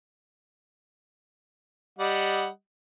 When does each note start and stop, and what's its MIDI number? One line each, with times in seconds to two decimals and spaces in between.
1.99 2.48 55
1.99 2.48 75
1.99 2.48 78